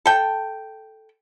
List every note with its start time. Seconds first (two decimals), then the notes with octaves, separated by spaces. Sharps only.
0.06 A4 G5